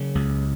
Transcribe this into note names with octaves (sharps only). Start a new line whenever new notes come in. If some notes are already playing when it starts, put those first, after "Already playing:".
Already playing: C#3 F#3
C#2